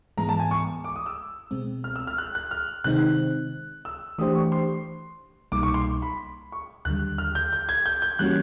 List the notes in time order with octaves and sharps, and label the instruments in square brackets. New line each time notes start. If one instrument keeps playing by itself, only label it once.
[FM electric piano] G#2 E3 G#3 B3 [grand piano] A#5
[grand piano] A5
G#5
C#6
D6
D#6
E6
[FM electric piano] B2 G#3 C4
[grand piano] F6
E6
F6
F#6
F#6
F6
[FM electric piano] C3 D#3 G#3 C4 D#4 [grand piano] F#6
[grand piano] E6
[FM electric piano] E3 A3 D4 G4 C5 [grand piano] D#6
[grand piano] C#6
C6
[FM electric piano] C2 B2 G3 A#3 D#4 [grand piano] D6
[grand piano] C#6
C6
B5
C#6
[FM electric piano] D#2 D3 G3 [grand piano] F#6
[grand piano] F6
G6
G6
G#6
G6
G6
[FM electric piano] E3 G3 A#3 C#4 F#4 [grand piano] F#6